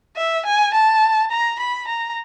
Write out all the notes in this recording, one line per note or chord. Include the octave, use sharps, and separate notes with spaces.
E5
G#5
A5
A#5
B5
A#5